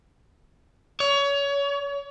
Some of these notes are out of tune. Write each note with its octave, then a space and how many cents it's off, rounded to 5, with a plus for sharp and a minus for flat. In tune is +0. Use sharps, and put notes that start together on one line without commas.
C#5 +25